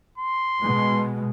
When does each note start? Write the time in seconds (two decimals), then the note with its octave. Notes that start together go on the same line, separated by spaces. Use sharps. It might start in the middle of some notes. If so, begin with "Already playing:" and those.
0.18 C6
0.62 B2 G#3